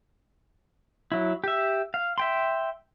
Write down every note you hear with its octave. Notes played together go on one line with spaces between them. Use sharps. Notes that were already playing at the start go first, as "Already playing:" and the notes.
F#3 E4
G4 E5
F5
E5 G5 C6